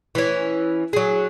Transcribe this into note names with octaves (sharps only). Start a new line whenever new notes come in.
E3 C#4
F#3 G#4